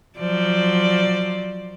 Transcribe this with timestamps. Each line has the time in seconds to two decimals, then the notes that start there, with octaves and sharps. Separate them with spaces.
0.19 F3 F#3 D5